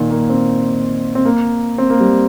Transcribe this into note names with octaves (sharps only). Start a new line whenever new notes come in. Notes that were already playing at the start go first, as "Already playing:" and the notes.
Already playing: A#2 D#3
A#3
C4
C4
A#3
C4
A#3
G3